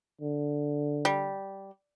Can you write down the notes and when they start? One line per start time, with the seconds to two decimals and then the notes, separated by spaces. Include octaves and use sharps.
0.21 D3
1.05 G3